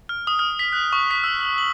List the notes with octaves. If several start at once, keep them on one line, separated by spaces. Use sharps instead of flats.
F6
D#6
F6
B6
F#6
C#6
B6
E6
F#7
F#7